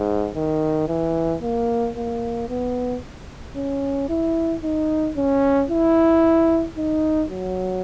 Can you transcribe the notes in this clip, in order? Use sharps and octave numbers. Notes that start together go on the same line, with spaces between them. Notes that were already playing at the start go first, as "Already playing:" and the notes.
Already playing: G#2
D#3
E3
A#3
A#3
B3
C#4
E4
D#4
C#4
E4
D#4
F#3